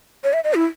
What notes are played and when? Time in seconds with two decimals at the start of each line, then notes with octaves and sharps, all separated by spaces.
0.24 C#5
0.33 E5
0.44 D#5
0.54 E4